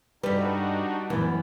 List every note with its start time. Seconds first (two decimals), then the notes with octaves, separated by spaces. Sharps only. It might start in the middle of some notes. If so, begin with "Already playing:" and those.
0.23 G2 G3 D4 D#4 F#4 B4
1.10 F#2 E3 B3